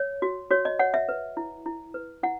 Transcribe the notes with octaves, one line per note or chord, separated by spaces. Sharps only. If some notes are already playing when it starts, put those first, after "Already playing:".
Already playing: C#5
F#4
F#4 C#5
D#5
C#5 F#5
E5
B4
E4
E4
B4
E4 F#5